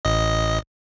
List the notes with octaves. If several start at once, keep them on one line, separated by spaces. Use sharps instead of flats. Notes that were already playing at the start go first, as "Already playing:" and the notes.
A1 D#5